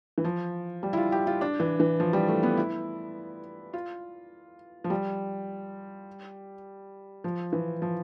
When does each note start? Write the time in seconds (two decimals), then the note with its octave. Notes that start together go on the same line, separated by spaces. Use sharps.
0.18 E3
0.24 F3
0.83 G3
0.93 E4
0.97 F4
1.12 G4
1.27 F4
1.41 D4
1.60 E3
1.80 E3
2.00 F3
2.13 G3
2.28 A3
2.43 B3
2.57 E4
3.73 F4
4.84 F3
4.90 G3
7.24 F3
7.53 E3
7.82 F3